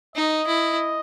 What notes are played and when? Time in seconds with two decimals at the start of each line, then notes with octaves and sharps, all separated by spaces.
0.16 D#4 D#5
0.47 E4